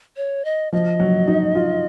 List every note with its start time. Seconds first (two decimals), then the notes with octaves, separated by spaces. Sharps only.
0.17 C#5
0.45 D#5
0.73 F3 D#5
1.00 F#3
1.28 D#4
1.55 F4